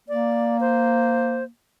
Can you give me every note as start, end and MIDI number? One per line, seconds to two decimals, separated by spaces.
0.09 1.47 58
0.09 0.57 74
0.61 1.44 72